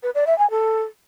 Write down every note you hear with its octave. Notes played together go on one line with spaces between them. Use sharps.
B4
D5
E5
G#5
A4